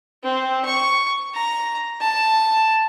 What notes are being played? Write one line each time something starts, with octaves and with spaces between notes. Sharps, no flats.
C4
C#6
A#5
A5